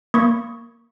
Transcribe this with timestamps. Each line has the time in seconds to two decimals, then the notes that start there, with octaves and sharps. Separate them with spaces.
0.14 A#3 C#6